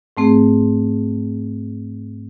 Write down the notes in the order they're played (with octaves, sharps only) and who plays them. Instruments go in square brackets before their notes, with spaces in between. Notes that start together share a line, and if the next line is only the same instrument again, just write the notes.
[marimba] G#2 A3 C4 G#4